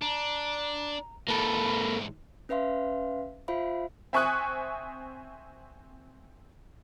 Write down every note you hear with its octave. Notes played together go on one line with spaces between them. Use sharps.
D4 A#5
G#2 E3 A#3 A4 B5
C#4 B4 E5 F5 C6
F4 C5 E5 F5 B5
C4 E5 G#5 C#6 D#6 F#6